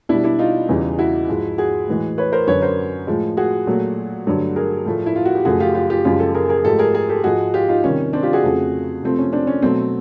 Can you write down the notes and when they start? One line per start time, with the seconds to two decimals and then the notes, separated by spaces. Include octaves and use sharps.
0.09 B2 G3 D4 E4
0.24 D4 E4
0.39 D#4 F4
0.69 E2 C#3 E3 G3
0.98 E4 F#4
1.29 G#2 F3 G#3
1.58 F#4 G#4
1.87 A2 E3 G#3
2.18 B4 C#5
2.33 A#4 C5
2.47 F#2 D3 F#3 B4 C#5
2.62 A#4 C5
3.07 A2 F3 G#3
3.37 F#4 G#4
3.67 A#2 F#3 A3
4.26 G2 D3 F#3 A3
4.56 G#4 A#4
4.85 A2 F3 A3
5.06 E4
5.16 F4
5.25 F#4
5.35 G4
5.45 F#2 C#3 F3 A3 F#4 G#4
5.60 F4 G4
5.75 F4 G4
5.90 F4 G4
6.05 F#2 C#3 F3 G#3 F4 G4
6.20 G4 A4
6.34 G#4 A#4
6.49 G#4 A#4
6.64 G#2 F3 A3 G4 A4
6.79 G#4 A#4
6.94 G#4 A#4
7.09 G4 A4
7.24 G#2 F3 G#3 F#4 G#4
7.54 F4 G4
7.68 D#4 F4
7.83 C3 D#3 G3 C#4
8.13 C4 D4
8.23 F4 G4
8.33 F#4 G#4
8.44 F2 C#3 F3 A3
9.03 C3 F3 A3 C4
9.19 C#4
9.33 C4 D4
9.47 C#4
9.62 B2 F#3 A3 C4